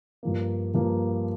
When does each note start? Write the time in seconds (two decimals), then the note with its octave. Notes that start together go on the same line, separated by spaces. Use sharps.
0.23 G2 F3 A#3
0.74 G2 F3 A#3